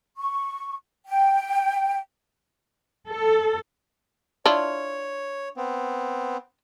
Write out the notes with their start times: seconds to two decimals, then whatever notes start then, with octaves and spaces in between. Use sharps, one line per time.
0.17 C#6
1.08 G5
3.08 A4
4.46 D4 E4 F4 C#5
5.57 B3 C4